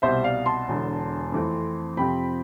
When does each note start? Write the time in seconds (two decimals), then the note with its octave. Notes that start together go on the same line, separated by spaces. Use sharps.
0.02 C2 B2 G3 C5 E5
0.24 D5 F5
0.46 A5 C6
0.68 E1 E2 D3
1.32 F2 E3 A3 C4
1.97 F2 C3 F3 C4 G5 B5